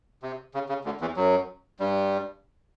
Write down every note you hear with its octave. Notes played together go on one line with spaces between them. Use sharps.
C3
C#3
C#3
D2 D3
E2 E3
F#2 F#3
G2 G3